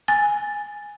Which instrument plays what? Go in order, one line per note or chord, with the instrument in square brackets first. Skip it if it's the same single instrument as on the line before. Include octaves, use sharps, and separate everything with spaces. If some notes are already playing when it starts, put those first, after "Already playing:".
[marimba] G#5 [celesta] A6